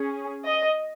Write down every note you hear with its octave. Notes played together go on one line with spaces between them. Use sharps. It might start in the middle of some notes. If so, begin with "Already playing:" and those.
Already playing: C#4 G#4
D#5